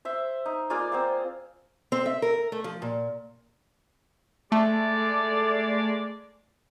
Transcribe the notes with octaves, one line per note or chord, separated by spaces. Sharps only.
C5 E5
D#4
A#3 F4 G#4 D5
C4 C5 F5
C4
E5
A#4
A3
F3
A#2
G#3 A3 D5